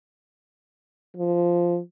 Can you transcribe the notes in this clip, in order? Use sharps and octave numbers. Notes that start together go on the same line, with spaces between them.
F3